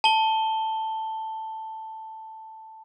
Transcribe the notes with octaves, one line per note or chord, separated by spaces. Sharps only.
A5 G7